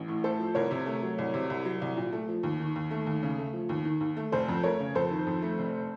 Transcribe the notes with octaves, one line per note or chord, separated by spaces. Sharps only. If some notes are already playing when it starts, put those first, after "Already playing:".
Already playing: A1
A2
A3 A4 C5
F3
C2 A#4 C#5
C3
A3
F#3
C2
C3
C2
F#3
C2
A#2
A3
F3
D#2
D#3
D#2
A3
D#2
C#3
A3
F3
D#2
D#3
D#2
A3
F1 A4 C5
F2
A3 A#4 C#5
C#3
F2 A4 C5
D#3
F2
A3
F1